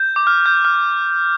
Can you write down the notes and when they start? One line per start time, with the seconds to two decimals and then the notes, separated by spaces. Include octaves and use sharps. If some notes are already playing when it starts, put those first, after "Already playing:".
Already playing: G6
0.16 D6
0.27 F6
0.46 G6
0.65 F6